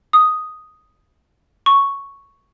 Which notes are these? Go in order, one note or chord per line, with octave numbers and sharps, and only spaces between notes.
D#6
C#6